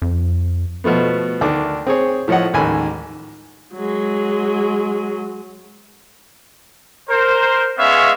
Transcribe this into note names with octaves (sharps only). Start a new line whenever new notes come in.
F2
B2 F3 A3 B3
D2 D#3 D4 D6
C4 G#4 C#5
A2 F3 C#5 D#5 F#5
A1 D#2 G#2 G#5 B5
F#3 G#3
A#4 C5
G#3 B3 C#4 C#5 E5 F5